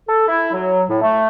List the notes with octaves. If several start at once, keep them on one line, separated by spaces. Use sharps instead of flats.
A4
E4
F#3
A2
A3